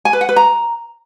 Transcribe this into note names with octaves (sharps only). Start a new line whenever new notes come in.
G#5
B4
F#5
B4
A#5